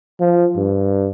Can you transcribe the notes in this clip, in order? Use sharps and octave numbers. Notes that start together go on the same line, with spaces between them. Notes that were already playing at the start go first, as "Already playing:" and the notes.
F3
G2